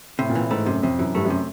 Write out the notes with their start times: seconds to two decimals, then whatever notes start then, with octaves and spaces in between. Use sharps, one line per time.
0.19 A2 C3
0.30 A#2
0.35 A2 E3
0.51 G#2 A3
0.66 F#2 C3
0.83 F2 C3
0.99 F#2 E3
1.15 G2 A3
1.25 F#2
1.30 C3